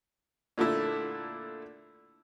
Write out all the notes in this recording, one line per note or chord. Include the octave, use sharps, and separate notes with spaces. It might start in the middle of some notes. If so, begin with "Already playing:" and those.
A#2 D3 A3 E4